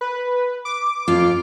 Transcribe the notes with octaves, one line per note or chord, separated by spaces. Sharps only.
B4
D6
F2 F4